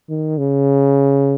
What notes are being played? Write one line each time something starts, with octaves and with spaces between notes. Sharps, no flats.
D#3
C#3